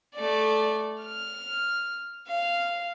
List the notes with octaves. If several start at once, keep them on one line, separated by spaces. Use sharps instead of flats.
A3 D5
F6
F5